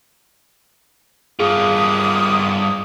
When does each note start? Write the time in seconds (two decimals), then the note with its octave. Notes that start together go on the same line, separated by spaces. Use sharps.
1.40 G2 A#3 F4 G#4 D6 D#6